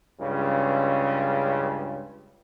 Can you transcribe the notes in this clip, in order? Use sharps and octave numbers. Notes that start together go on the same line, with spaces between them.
C#2 G2 C#3